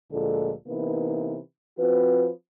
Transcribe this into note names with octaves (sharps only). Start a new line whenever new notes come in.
D2 A#2 D3 F3 G#3 A4
C3 E3 A#3 B3 D#4 B4
F3 C4 F#4 B4